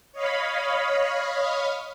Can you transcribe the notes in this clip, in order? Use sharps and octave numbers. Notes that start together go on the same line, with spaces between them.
C#5 D#5 F5 B5